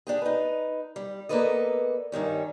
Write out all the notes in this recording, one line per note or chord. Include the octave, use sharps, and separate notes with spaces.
D4 G4 G#4
D#4 B4
G3
A#3 B3 A4 B4 D5 D#5
G2 D#3 G3 C#4